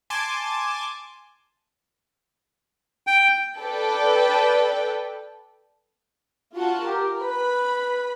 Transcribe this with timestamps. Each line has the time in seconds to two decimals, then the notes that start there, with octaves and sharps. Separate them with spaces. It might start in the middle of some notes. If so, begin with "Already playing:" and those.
0.10 G#5 A5 C6 D6
3.07 G5
3.58 A4 B4 D5 G5
6.55 F4 F#4 A5
6.85 G4 A#4
7.22 B4 B5